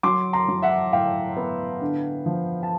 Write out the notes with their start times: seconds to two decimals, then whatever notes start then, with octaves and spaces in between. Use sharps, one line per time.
0.03 F#3 C6 D6
0.33 A#5 C6
0.48 F#3
0.62 E5 F#5
0.93 A2 F5 G5
1.37 B3
1.81 D3
2.26 F3
2.63 A5